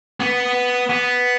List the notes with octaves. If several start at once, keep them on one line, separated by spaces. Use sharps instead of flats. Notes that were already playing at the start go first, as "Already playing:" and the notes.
B3
B3